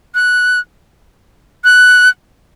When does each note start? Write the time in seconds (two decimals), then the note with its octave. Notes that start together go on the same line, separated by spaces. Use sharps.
0.15 F#6
1.64 F#6